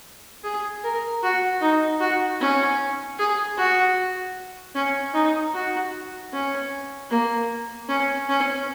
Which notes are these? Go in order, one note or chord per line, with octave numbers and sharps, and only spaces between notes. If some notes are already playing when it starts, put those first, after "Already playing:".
G#4
A#4
F#4
D#4
F#4
C#4
G#4
F#4
C#4
D#4
F#4
C#4
A#3
C#4
C#4